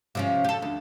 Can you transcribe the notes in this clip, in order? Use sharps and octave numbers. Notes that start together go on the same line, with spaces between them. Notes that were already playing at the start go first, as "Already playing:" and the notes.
C3 F3 C#4
G4 A4
D2